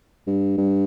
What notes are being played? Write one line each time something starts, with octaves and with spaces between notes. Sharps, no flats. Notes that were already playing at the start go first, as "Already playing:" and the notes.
G2
G2